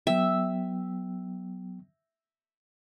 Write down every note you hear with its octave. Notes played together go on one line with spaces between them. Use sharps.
F#3 B3 E5 G5